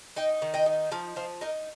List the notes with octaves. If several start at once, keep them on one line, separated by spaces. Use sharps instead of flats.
D#4 D#5 G5
D#3
D#5 G5
D#4
F3 F5 A#5
F3 C5 F5
D#4 A#4 D#5